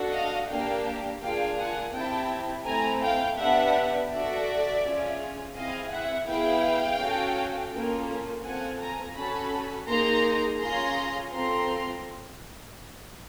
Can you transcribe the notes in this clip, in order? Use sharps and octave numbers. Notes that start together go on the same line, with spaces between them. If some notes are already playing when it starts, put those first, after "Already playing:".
Already playing: D4 F#4 A4
D#5 F5
A#3 D4 G4 F5 G5
A#3 D4 F4 G#4 F5 G5
F#5 G#5
C4 E4 G4 G5 A5
A3 C4 E4 A4 G#5 A#5
F5 G5
B3 D4 G4 E5 F#5
D4 F#4 A4 D5 E5
C#4 F4 G#4
C4 E4 G#4 D#5 F5
E5 F#5
B3 E4 G#4 F5 G5
C#4 F#4 A4
A#3 C#4 F4 A4
C4 F4 A4 F#5 G#5
G#5 A#5
C#4 F#4 A4 A5 B5
A#3 D#4 G#4 A#5 C6
C#4 F4 G#4 A#5 C6
C4 F4 A4 A#5 C6